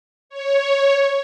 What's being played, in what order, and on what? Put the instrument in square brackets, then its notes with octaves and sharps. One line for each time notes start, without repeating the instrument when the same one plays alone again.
[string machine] C#5